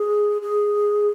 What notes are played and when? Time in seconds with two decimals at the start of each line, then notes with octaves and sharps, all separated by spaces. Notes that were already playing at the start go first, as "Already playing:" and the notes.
Already playing: G#4
0.42 G#4